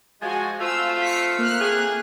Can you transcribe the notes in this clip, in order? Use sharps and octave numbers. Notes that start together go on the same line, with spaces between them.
F3 G#3 F#4 G#5
A3 C4 F4 E6
B6 C#7
A#3 F6 F#6
C3 A3 G#4